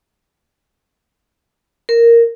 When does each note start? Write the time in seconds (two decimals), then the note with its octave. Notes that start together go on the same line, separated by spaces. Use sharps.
1.89 A#4